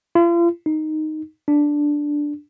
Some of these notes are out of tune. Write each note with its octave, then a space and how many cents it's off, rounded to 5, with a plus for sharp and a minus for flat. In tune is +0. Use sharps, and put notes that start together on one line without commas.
F4 -40
D#4 -5
D4 +0